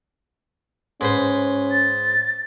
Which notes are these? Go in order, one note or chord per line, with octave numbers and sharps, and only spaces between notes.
G#2 C#4 B4 C5
A6